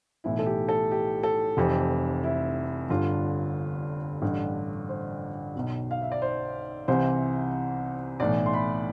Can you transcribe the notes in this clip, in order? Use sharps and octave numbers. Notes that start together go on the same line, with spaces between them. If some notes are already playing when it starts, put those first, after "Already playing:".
B1 A2 E3 E4
A4
G4
A4
G4
A4
F1 F2 E3 G4
E4
G1 G2 D3 F4
A1 G2 D3
C5
B1 B2
F5
E5
D5
C5
C2 C3 E3 C5
B1 A2 E3 D5
C6
B5